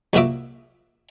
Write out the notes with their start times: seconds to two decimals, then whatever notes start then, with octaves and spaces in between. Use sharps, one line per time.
0.13 C2 A#2 F#4 E5 D6